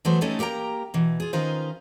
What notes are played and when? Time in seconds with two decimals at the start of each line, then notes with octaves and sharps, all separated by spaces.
0.05 E3 F#3 A3 B3 C5
0.21 A3 C#4 D#4 G4 A4 D#5
0.39 A#3 G4 A#4 G5 A#5
0.94 B2 E3
1.20 F4 G#4
1.33 D#3 C#4 D#4 F4 B4 C5